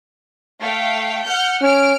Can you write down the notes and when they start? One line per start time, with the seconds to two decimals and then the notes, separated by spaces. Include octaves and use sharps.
0.60 A3 F5 G5
1.24 F#5 F6 G6
1.62 C#4 F6 D7